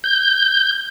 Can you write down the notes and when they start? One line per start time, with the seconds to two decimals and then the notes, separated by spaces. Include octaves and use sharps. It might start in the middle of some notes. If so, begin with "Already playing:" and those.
0.04 G6